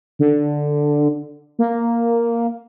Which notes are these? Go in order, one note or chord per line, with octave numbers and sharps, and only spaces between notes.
D3
A#3